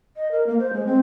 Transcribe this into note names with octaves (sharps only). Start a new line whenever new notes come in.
D#5
A#4
A#3
C5
G#3
C4